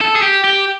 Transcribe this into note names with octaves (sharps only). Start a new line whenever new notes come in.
A4
G#4
G4
G4